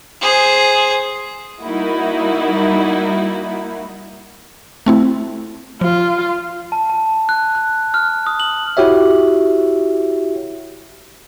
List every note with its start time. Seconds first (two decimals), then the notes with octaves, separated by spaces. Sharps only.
0.21 G#4 C5
1.62 G3 A#3 D#4 E4 F#4
4.86 A3 C4 E4
5.81 F3 F4
6.72 A5
6.90 A5
7.29 F#6
7.55 F#6
7.94 F6
8.27 D#6
8.40 F#7
8.77 E4 F#4 G4 C#5 E5